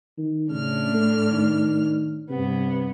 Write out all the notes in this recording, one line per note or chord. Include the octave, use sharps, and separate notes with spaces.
D#3
A2 C#3 D4 F6
A3
D#3
G2 C3 B3